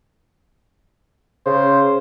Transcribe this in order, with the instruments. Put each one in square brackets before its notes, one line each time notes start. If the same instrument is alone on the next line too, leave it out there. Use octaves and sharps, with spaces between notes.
[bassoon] C#3 [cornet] C5